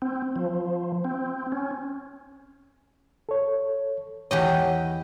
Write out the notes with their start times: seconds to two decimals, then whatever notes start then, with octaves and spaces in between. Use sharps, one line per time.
0.02 C4
0.36 F3
1.05 C4
1.52 C#4
3.29 A4 C#5
4.31 E2 G4 C#5 D#5 F#5